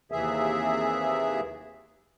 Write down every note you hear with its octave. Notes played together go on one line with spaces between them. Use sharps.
D#2 C3 E3 G#4 E5